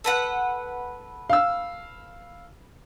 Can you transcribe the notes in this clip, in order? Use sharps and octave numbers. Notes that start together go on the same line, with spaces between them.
A4 B4 F#5
F5 E6